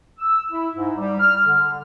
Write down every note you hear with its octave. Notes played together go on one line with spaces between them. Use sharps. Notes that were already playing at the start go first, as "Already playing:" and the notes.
E6
E4
G#2
G3
F6
D3